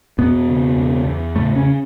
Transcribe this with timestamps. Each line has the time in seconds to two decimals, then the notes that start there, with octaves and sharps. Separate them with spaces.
0.18 E2 B2 B3
0.48 C#3
0.77 E2
1.06 E2
1.36 A2 C#3 A3
1.55 C#3 C#4